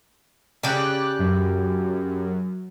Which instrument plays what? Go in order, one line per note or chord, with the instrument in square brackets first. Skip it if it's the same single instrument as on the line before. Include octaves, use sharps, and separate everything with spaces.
[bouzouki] C#3 G4 [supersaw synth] D5 F#6
[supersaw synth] F#2